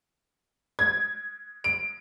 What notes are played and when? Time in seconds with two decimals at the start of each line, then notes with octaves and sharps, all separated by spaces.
0.79 G#6
1.64 D7